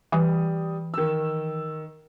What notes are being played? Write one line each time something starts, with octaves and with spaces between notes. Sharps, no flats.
E3 G3 D#6
D#3 E6